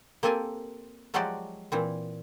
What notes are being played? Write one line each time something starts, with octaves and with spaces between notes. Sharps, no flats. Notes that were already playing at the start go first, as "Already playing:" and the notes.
A#3 C4 G4 A4 G#5
F3 F#3 G#3 F#4 G4 D5
A#2 E3 C4